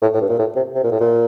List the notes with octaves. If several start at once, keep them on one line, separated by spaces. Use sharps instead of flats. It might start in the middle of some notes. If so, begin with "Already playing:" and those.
A2
A2
G2
A#2
A2
C3
C3
A#2
A2
A#2